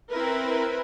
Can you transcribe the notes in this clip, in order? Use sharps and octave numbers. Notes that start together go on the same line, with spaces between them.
C4 E4 A#4 B4